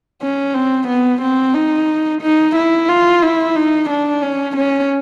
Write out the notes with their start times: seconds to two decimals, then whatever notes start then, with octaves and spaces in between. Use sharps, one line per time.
0.22 C#4
0.54 C4
0.88 B3
1.22 C4
1.54 D#4
2.22 D#4
2.56 E4
2.89 F4
3.23 E4
3.56 D#4
3.90 D4
4.23 C#4
4.56 C#4